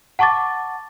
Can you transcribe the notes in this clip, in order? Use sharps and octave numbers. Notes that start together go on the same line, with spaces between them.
F#5 A5 C#6 D6 A6